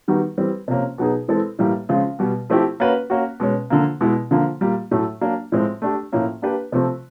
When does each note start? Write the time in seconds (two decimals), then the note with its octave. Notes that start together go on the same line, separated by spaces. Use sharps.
0.08 D#3 G3 B3 D#4 F#4
0.38 E3 G3 C4
0.68 C3 F3 A#3 C#4
0.98 B2 F#3 B3 D#4 G#4
1.28 E3 G#3 C4 E4 A4
1.59 A2 E3 G3 A#3
1.89 C#3 F3 G#3 C4 F4
2.19 B2 G3 B3
2.50 F3 A3 C4 E4 G4
2.80 A#3 C#4 F#4 B4
3.10 A#3 C#4 F#4
3.40 B2 G#3 C#4
3.70 D3 F3 A#3
4.01 B2 G#3 B3 E4
4.31 D3 F3 A#3
4.61 A#2 G3 A#3
4.91 A2 F#3 A3
5.21 F#3 A#3 D4
5.52 A2 F3 G#3 C4
5.82 A3 D4 G4
6.12 A2 F3 A#3 C#4
6.42 A#3 D4 G4 B4
6.72 C3 F3 A3 C4